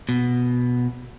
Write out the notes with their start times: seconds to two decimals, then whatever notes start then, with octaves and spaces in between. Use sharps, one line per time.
0.09 B2